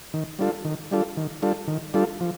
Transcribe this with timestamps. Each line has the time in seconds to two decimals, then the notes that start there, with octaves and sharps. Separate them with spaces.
0.14 D#3
0.39 G3 D4 F4 A4
0.65 D#3
0.91 G3 D4 F4 A4
1.17 D#3
1.42 G3 D4 F4 A4
1.68 D#3
1.94 G3 D4 F4 A4
2.21 F3